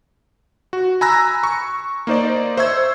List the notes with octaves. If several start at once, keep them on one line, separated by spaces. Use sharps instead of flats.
F#4
G#5 A#5 B5 E6 F#6 A#6
C#6
A#3 D#4 C5 D5
C5 E5 C#6 E6 G#6